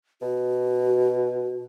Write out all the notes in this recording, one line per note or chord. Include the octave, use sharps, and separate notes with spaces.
B2 F#4